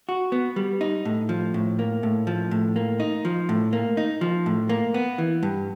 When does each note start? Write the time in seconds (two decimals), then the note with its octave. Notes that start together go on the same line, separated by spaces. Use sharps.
0.09 F#4
0.32 B3
0.56 G3
0.81 D#4
1.05 A2
1.29 F3
1.54 A2
1.79 A#3
2.03 A2
2.27 F3
2.51 A2
2.76 A#3
3.00 D#4
3.25 F3
3.49 A2
3.73 A#3
3.97 D#4
4.21 F3
4.46 A2
4.69 A#3
4.94 B3
5.18 E3
5.43 G2